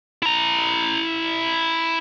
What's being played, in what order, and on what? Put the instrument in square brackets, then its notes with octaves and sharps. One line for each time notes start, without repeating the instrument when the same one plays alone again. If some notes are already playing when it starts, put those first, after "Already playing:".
[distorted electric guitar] E4 A#5